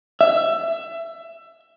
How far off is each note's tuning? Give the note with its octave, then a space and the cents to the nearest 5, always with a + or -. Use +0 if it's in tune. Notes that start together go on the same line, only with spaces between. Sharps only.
E5 +20